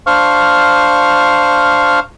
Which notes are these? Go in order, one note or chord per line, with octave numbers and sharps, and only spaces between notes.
D4 C5 F5 C#6 F6